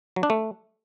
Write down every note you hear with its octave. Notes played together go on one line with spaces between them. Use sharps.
F#3
D4
A3